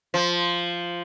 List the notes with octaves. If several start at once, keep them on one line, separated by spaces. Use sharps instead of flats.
F3